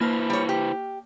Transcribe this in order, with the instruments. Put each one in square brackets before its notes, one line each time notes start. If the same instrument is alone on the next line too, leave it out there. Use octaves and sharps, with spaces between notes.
[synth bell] A#3 A5 F6 [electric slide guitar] E4 B4 C5
[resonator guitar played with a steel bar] G3 C#5
G4